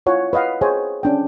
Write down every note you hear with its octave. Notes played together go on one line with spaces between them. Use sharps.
E4 F4 C#5 F#5 G#5
B4 D#5 F5 F#5
G#4 C5 C#5 D#5 G5 G#5
C#4 D4 G5